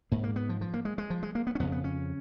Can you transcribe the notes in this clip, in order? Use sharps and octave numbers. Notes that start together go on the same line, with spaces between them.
G#2 A#3
A#3
B3
F3
F3
A#3
G#3
G#3
F3
G#3
A#3
B3
C#4
F2 C#3 B3
B3
C#4